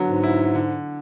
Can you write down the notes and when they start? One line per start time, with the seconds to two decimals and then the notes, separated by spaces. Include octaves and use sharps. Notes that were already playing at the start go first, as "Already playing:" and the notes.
Already playing: D3 F#3 B3
0.08 G#2
0.24 E4
0.55 D3